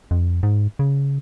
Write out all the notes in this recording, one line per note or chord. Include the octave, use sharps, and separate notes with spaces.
F2
G#2
C#3